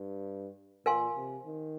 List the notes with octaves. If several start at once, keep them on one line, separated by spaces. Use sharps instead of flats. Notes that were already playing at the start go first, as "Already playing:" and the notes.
Already playing: G2
A#2 A#4 F5 G#5 C6
C3
D#3